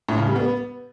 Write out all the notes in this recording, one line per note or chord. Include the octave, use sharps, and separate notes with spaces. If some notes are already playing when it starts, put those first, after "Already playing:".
A2
C#3
G3
B3